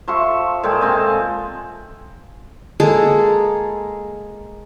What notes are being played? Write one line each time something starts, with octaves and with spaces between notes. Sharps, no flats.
F3 E5 C6 C#6
A#2 G#3 A4 G5
G#3 C4 A5
G#3 A#3 G#4 A4